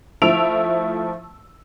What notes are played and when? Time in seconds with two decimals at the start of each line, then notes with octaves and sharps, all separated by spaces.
0.22 F3 A3 E4 E6 D7 F7